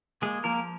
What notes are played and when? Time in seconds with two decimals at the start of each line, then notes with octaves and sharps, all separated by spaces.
0.22 G#3 A#3 G#4
0.44 F3 A#3 A#4